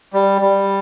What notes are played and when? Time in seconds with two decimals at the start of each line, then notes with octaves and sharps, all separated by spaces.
0.13 G3
0.42 G3